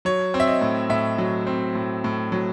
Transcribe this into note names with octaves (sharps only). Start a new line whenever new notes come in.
F#3 C#5
C4
E5
D#5
A2
A2 E5
F#3
C4
A2
A2
F#3